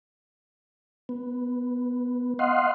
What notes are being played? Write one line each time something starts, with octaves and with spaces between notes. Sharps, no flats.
B3
D#5 F5 F#5 C6